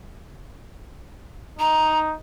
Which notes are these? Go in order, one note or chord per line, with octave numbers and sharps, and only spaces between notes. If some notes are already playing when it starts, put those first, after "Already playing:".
D#4 A#5